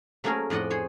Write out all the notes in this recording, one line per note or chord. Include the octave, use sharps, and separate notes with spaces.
F#3 A3 A#3 C#4 G#4 A#4
F2 A2 D5 D#5 F#5
G#4 C5 C#5